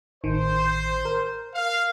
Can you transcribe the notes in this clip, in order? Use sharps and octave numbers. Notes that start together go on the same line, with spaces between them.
A1 D#3 C5
A#4
F5